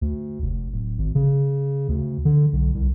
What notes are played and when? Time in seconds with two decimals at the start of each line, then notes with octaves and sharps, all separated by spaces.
0.01 D2
0.42 F1
0.72 D1
0.98 G#1
1.15 C#3
1.89 D2
2.25 D3
2.53 B1
2.74 C2